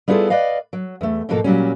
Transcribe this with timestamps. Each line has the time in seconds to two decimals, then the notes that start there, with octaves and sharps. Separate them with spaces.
0.08 G3 B3 E4 F4 G#4 A4
0.30 B4 D5 D#5 F5
0.73 F#3
1.01 E2 A3
1.29 G#2 B2 F3 A#3 A4
1.44 A#2 F#3 G3 C#4